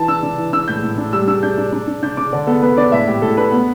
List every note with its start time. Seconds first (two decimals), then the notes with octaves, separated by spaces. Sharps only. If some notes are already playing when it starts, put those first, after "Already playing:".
Already playing: E3 A5
0.08 D4 E6
0.23 D4
0.38 E3
0.53 D4 E6
0.68 A2 G6
0.83 A2
0.98 D4
1.13 G3 E6
1.27 D4 E6
1.43 D4 G6
1.58 D4
1.73 D4
1.87 D4
2.03 D4 G6
2.17 D4 D6
2.32 D3 D5
2.47 B3 A4
2.62 B3 B4
2.77 D4 D5
2.92 A2 E5
3.08 A2 G4
3.22 A2 A4
3.37 D4 B4
3.52 B3